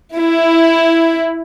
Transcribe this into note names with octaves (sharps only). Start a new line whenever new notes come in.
E4